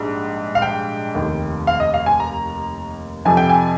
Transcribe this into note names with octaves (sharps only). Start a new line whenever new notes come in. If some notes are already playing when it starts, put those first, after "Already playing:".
Already playing: A#1 G#2 G3
F5
G5
F1 D#2 D#3
F5
D#5
F5
G#5
A#5
F2 C3 F3 G#5
G5
G#5